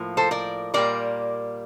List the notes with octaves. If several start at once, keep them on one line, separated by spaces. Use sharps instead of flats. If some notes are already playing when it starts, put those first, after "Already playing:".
Already playing: A2 F3 A#3
A4 C5
A#4 D5
A#2 G3 A#3 A#4 D5